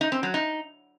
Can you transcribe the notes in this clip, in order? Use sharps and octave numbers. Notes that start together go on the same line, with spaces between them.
D#4
C4
F#3
D#4